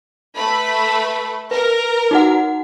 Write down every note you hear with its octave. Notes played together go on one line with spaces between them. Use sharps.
A3 B4 B5
A#4 B4
D#4 F#4 F#5